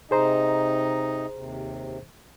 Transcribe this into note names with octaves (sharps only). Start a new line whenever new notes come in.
C3 D#4 G#4 C5 D#5 A#5
D#2 C3